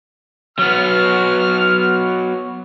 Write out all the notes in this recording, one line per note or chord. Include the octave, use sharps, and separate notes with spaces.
F#3 B3 F6